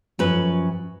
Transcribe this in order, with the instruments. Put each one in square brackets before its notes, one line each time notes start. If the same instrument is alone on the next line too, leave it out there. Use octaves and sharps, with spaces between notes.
[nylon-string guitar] F#2 C#4 B4 [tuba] F3